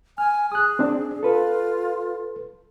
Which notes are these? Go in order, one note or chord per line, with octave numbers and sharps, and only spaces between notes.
G#5 F6
G#4 D#6 F#6
C4 D4
F4 A4 B4